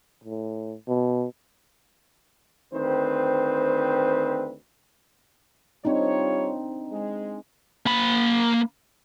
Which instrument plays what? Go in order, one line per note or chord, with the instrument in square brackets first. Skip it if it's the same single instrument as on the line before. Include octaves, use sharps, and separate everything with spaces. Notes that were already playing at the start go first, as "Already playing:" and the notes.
[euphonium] A2
B2
[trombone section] D2 D#3 C4 B4 C5
[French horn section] G3 F4 C#5 [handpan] C4 D4 D#4
[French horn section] G#3
[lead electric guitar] A#3 B5